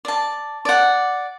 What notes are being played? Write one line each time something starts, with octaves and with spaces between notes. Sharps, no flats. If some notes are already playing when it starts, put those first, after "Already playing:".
D5 A5
D5 F#5